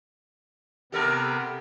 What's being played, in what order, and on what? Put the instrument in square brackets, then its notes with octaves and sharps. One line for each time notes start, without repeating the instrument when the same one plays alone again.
[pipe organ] C3 B3 [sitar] G4 A4 A#4